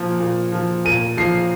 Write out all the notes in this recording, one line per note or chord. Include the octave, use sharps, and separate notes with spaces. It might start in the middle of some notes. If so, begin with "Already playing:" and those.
Already playing: A#2 F3
A#2
F3
A#2 D#7
F3 C7